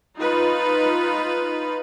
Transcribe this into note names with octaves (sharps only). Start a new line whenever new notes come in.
D#4 F4 B4